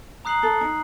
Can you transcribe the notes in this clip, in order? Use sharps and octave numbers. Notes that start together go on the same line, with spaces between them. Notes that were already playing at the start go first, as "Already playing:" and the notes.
A#5 D#6 F#6 C7 F#7
A4
D#4